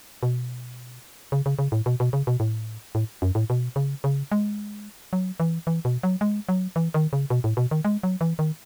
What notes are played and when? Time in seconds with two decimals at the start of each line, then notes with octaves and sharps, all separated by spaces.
0.23 B2
1.32 C#3
1.46 C#3
1.59 C#3
1.72 A2
1.86 B2
2.00 B2
2.13 C#3
2.27 B2
2.40 A2
2.95 A2
3.22 F#2
3.35 A2
3.50 B2
3.76 C#3
4.04 C#3
4.32 G#3
5.13 F#3
5.40 E3
5.67 E3
5.85 B2
6.03 F#3
6.21 G#3
6.49 F#3
6.76 E3
6.94 D#3
7.13 C#3
7.30 B2
7.44 A2
7.57 B2
7.71 D#3
7.85 G#3
8.03 F#3
8.21 E3
8.39 D#3